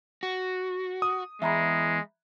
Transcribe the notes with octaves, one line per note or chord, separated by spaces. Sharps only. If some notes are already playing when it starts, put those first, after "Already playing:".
F#4
D#6
E2 G#3 E5 A#5 B5